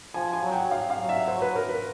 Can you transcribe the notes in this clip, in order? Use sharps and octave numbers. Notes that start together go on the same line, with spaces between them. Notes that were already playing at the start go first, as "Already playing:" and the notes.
F3 G#5
G#5
F#3
G5
F5
F5
F#3
E5
C5
B4
A#4
B4